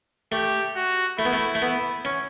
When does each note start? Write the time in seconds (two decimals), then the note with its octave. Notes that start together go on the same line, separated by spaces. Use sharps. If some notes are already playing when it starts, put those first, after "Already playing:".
0.32 A3 G4
0.76 F#4
1.19 A3 E4
1.25 B3
1.33 A3
1.55 A3
1.62 B3
2.05 C#4